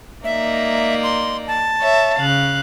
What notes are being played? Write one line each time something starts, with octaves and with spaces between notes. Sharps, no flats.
A#3 D#4 D5 E5
C6
A5
C#5 E5
C#3 F5 F#6